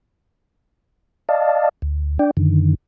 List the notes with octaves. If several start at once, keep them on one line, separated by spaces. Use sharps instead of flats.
D5 D#5 F5 A5
D2
D4 D5 G5
F#2 D3 D#3